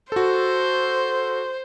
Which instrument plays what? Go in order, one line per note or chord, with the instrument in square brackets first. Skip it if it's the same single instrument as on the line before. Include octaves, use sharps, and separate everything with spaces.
[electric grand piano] F#4 A4 [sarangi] C5